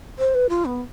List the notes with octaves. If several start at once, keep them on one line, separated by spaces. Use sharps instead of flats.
C5
B4
F4
B3